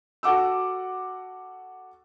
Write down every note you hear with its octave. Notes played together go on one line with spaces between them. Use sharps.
F#4 A4 F#5 D6 E6